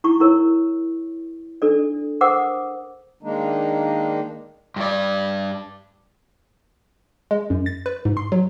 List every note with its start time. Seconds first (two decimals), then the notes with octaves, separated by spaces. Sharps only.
0.04 E4 C#6
0.20 E4 A#4 C#5
1.62 D4 A4 D5
2.21 A#4 C5 F#5 D6 D#6
3.23 D#3 G#3 A#3 D4 D#4
4.76 G2 D5
7.31 G#3
7.50 F#2
7.66 A6
7.86 B4
8.05 G#2
8.17 C6
8.32 F#3